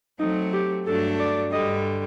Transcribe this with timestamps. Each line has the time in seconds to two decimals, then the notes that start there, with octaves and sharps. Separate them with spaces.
0.19 F#3 A3 C4 D#4
0.53 G4
0.87 G2 F#3 A3 D4 A4
1.20 D5
1.52 G2 D3 G3 D#5